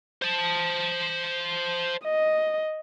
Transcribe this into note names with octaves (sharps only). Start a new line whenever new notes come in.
C5 A5
D#5